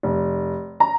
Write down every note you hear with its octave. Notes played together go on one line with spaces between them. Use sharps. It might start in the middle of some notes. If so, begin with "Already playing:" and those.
F1
A#5